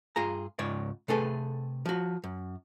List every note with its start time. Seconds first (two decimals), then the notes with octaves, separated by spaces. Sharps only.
0.16 G2 F4 G#4 A#5
0.59 C#2 G#2 C#5 D5
1.08 C3 A3 G#4 A4 B4
1.86 F3 F#4
2.24 F#2